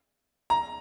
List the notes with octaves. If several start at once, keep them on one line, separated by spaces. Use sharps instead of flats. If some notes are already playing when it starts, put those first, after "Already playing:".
A#5